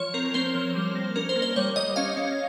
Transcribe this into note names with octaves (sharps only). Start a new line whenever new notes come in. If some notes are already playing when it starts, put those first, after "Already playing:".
Already playing: F3 C#5
C4 A#4
C4 C5
F3
G3
A#3
C#4 A#4
C5
A#3
C5
G3 C#5
G3 D#5
C#4 F5
C#4